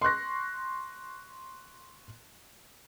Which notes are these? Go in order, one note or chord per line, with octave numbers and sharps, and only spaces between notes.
C6 C#6 F#6 A#6